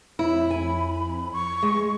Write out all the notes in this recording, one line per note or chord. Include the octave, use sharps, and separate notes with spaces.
F2 E4 B5
G#5
C#6
G#3